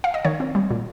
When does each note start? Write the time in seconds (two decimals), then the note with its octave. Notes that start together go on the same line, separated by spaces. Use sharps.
0.04 F5
0.14 D#5
0.25 D#3 C#5
0.40 C4
0.55 G3
0.71 A#2